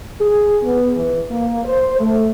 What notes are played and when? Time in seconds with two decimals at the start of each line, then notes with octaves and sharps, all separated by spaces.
0.21 G#4
0.63 B3
0.97 E3
1.30 A#3
1.65 C5
1.99 A3